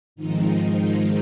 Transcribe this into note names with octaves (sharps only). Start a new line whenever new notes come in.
G#2 D#3 F3 G#3 C4 D#4